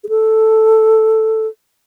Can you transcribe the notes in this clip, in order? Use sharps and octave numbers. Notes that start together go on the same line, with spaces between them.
G#4
A4